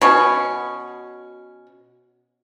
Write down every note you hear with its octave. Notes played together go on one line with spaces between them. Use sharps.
B2 C#4